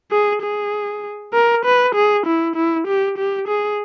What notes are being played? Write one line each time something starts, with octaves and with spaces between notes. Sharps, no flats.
G#4
G#4
A#4
B4
G#4
E4
E4
G4
G4
G#4